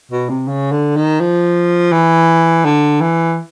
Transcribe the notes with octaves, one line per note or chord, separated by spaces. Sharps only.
B2
C3
C#3
D3
D#3
F3
E3
D3
E3